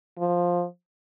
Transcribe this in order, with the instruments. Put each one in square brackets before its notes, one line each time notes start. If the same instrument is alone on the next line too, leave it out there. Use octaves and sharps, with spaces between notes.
[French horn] F3